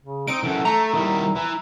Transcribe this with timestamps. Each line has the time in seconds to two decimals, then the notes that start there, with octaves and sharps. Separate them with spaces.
0.04 C#3
0.28 C4 D#4 D#5 D7
0.43 F#2 E3 A4
0.65 A3 A#5
0.94 D#3 G3 E4
1.36 E3